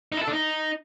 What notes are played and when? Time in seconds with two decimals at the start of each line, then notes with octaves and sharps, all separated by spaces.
0.12 D#4
0.17 E4
0.22 A4
0.27 D4
0.32 D#4